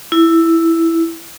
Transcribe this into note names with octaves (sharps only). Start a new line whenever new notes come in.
E4